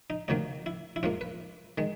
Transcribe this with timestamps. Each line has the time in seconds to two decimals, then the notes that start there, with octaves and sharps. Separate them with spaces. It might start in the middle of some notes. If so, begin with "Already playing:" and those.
0.10 D#4
0.28 D2 C3 D#3 F#3 A#3 D#4
0.66 E4
0.96 E4
1.03 G#2 F3 A#3 F4
1.21 B4
1.78 D#3 G#3